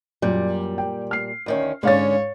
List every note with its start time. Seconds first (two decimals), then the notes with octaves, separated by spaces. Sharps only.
0.22 F#2 A#2 G3
0.78 G5
1.11 F6 C7
1.46 D2 D#3 C#4
1.83 G#2 D3 C#4 C#5 F5 A6